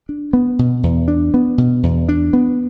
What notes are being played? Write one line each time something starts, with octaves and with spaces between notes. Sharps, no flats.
D4
B3
B2
E2
D4
B3
B2
E2
D4
B3